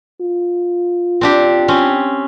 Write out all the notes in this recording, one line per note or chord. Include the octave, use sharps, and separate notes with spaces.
F4
C4 D4 G4
C4 C#4